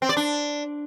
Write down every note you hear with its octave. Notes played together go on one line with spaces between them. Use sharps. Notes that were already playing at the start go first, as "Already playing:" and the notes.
C4
D5
D4